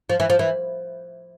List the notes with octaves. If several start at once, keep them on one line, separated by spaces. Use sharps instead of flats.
F3
E3
F3
E3